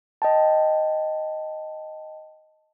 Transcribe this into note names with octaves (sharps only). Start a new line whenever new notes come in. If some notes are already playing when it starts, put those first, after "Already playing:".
D#5 G5 A5